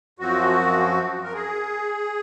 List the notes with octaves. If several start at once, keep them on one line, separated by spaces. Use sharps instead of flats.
F#2 F3 C4 F#4
A#4
G#4